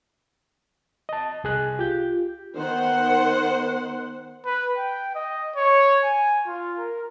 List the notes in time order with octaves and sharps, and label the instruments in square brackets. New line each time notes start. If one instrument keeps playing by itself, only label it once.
[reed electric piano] D#5 A5
C2 G#4 F#6
[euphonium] F4 [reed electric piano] G4 G6
[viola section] D#3 B3 C5 F#5
[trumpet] B4
G5
D#5
C#5
G#5
F4
A#4